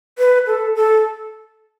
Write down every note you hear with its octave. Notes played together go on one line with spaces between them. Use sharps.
B4
A4
A4